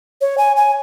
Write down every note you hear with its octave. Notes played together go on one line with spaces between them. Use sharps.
C#5
G#5
G#5